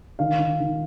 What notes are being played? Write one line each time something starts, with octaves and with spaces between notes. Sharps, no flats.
D#3 F5
D#3
D#3